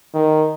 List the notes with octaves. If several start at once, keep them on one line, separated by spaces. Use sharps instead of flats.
D#3